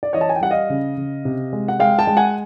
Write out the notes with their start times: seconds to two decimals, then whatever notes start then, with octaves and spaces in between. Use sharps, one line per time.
0.03 D5
0.13 E3 C#5 D#5
0.21 A5
0.29 G#5
0.36 G5
0.41 G3 F#5
0.51 D#5 F5
0.70 C#3
0.97 C#3
1.25 C3
1.53 G#3
1.68 F#5
1.79 G#3 F5 G5
1.99 G5 A5
2.07 G#3
2.17 F#5 G#5